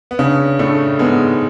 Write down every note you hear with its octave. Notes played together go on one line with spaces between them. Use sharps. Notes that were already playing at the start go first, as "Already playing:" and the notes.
B3
C#3 C#4 D4
A2 A3 D4
G#2 G#3 B3